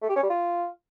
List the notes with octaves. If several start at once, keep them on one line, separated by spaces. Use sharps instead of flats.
A3
G4
C#4
G3
F4